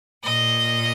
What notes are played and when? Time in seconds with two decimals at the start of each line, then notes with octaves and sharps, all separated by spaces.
0.24 A#2 D#5